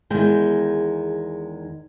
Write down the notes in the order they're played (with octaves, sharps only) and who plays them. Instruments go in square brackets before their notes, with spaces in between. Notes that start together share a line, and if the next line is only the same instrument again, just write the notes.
[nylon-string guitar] E2 D#3 G#3 G5